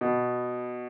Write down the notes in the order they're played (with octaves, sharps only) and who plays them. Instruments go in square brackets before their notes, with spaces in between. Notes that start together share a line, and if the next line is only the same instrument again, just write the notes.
[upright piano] B2